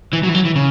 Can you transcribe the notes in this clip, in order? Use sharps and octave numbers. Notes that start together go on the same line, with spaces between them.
E3
F#3
E3
F#3
E3
C#3